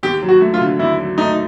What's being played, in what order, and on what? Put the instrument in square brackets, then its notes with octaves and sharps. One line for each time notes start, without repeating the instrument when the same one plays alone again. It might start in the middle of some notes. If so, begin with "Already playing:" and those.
[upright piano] D#2 [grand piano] G4
[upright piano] F#3
[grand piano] F#4
[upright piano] A3
[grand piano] F4
[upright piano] D3
[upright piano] D#2 [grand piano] E4
[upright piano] F#3
[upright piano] A3 [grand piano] D#4